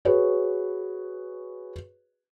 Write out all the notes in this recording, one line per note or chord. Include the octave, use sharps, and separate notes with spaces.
F#4 G#4 B4 C#5